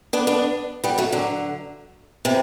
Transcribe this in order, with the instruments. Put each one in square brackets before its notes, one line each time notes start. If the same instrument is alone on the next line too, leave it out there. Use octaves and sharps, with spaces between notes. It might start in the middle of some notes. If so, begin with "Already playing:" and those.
[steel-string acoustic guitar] B3 D4
B3 D4
G3 B3
F#3 A3
D3 F#3
C3 E3